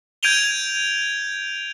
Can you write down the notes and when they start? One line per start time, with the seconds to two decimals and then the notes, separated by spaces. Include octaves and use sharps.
0.23 G6 G#6 D7 D#7 F7 G7